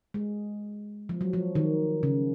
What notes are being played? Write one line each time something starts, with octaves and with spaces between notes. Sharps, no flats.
G#3
F3
F#3
F3
D#3
C#3